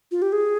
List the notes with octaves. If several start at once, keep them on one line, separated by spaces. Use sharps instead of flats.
F4
G4
G#4